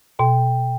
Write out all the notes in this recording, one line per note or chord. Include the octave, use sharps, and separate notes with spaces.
B2 G5